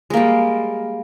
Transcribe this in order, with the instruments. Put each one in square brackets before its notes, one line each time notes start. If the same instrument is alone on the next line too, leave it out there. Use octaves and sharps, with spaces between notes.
[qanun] G#3
A#3
G3